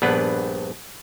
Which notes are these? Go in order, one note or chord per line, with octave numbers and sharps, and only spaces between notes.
A#1 G2 B3 D4 B4 F#5